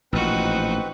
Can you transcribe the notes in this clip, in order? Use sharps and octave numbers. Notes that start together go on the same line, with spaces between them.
A1 A#2 F3 C4 D#4 F#4 B4